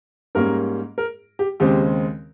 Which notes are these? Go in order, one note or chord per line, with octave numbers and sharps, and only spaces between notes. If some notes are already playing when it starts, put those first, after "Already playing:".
G#2 G3 A#3 C#4 A#4
A#4
G4
D#2 C#3 G#3 C4 G4